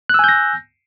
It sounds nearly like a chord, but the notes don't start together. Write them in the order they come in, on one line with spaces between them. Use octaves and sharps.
F#6 E6 G#5 G6 A#6